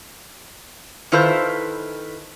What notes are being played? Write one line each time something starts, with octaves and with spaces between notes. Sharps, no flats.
D#3 E4 F4 A4 B4 C5